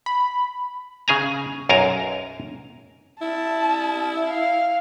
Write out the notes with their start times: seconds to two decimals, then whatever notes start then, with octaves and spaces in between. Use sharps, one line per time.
0.06 B5
1.08 C#3 G#4 G#5 A#5
1.69 B1 F#2 A#4 F5 G#5 A#5
3.22 E4 A5
4.28 F5